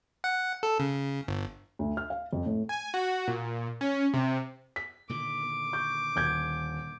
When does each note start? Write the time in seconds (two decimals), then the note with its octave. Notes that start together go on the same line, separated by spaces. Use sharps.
0.24 F#5
0.63 A4
0.79 C#3
1.28 G1
1.79 D2
1.97 F6
2.10 F5
2.33 F2
2.46 A2
2.69 G#5
2.94 F#4
3.28 A#2
3.81 C#4
4.14 C3
4.76 B6
5.09 A#2 D3 D#3 D6
5.73 C#6 G6
6.16 D#1 G6 G#6